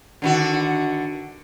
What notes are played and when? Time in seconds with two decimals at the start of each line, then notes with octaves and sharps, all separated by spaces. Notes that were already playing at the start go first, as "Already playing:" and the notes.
0.22 D3 D#3 F#4